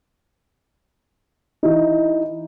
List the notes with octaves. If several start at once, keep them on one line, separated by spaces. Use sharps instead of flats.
E3 D#4